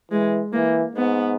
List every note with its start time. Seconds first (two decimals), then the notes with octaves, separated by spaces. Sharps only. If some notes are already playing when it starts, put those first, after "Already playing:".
0.11 E3 G#3
0.53 E3 A#3
0.95 G#2 B3